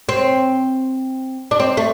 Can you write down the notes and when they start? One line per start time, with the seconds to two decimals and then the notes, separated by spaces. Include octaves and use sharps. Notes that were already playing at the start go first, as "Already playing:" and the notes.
0.09 C4
1.51 D4
1.60 C4
1.77 A3